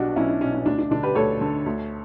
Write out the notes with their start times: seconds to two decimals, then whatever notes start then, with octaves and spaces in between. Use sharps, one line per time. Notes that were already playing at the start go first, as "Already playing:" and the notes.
Already playing: B1 B2 D4 F#4 G4
0.16 B1 C#4 E4
0.28 D4
0.41 B2 C#4
0.54 C#4
0.66 D2 D4
0.78 D4
0.91 D3 D4
1.03 G4 B4
1.15 D2 A4 C#5
1.41 D3
1.66 D2